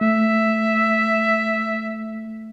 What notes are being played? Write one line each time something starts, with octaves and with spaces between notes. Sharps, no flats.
A3 E5